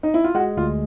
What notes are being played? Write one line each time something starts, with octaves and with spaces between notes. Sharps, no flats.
D#4
E4
F4
G#3 F#4
D2 F4